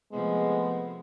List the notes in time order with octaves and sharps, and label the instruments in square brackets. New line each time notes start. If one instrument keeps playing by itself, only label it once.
[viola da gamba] C3 F3 A3 [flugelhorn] G#3 [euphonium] B3